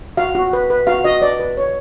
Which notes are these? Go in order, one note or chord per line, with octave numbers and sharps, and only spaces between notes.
F#4 F5
F#4
B4
B4
F#4 F5
F#4 D#5
B4 D5
B4
C#5